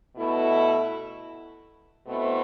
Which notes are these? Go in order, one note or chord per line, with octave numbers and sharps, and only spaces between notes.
B2 A3 E4
B2 A3 C4 E4